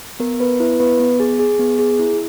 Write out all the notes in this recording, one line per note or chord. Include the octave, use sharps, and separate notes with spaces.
B3 A#4
B3 B4
E4 B4
B3 B4
B3
G#4
G#4
B3
G#4
E4